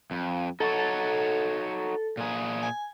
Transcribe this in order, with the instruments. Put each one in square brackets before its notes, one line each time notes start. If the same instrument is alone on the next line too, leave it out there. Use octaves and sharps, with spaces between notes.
[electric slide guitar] F2
[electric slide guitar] D#4 F#4 C#5 [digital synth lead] A4
[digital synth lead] A4
[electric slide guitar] A#2 G#4
[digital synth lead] G#5